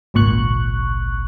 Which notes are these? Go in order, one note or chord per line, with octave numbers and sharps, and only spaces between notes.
G#1 C#2 A#2 C#6 F#6